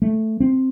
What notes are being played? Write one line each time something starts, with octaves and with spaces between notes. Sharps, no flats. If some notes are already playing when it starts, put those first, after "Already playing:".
A3
C4